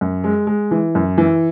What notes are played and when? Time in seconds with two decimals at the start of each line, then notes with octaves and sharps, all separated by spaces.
0.01 F#2
0.24 G#3
0.47 G#3
0.71 E3
0.95 F#2
1.18 E3